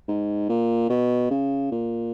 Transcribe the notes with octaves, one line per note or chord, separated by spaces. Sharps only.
G#2
A#2
B2
C#3
A#2